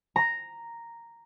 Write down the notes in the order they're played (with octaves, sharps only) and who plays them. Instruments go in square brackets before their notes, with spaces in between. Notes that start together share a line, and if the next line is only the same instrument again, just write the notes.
[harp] A#5